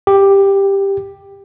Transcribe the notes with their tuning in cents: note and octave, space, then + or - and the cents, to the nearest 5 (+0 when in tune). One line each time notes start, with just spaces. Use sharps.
G4 +10